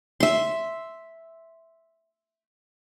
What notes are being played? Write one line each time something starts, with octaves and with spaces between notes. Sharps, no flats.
E5 C6